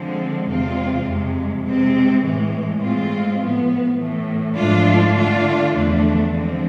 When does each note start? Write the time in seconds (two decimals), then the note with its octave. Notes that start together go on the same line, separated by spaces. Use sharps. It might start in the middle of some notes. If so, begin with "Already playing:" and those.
Already playing: D3 F3 G#3 C4
0.47 E2 C3 G#3 C4 F4
1.05 F2 C3 G#3
1.63 C3 G#3 C4
2.22 A2 E3 G#3
2.80 A2 G#3 C4 F4
3.39 A2 F3 B3
3.97 A2 E3 A3
4.56 G#2 F3 A3 D4 F4
5.14 D3 A3 D4 F4
5.73 E2 D3 F3 A3 D4
6.31 D3 F3 G#3 C4